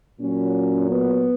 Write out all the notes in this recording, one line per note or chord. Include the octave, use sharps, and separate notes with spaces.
A#2 F#3 C#4
B3